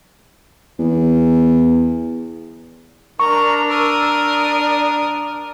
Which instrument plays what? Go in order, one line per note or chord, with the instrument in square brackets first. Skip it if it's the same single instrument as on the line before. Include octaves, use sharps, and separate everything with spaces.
[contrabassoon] E2
[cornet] D4 [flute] A#4 [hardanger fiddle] A#5 [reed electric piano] C#6
[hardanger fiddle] A#4 D#6 [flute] E6
[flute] D5